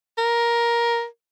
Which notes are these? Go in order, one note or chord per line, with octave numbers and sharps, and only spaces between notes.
A#4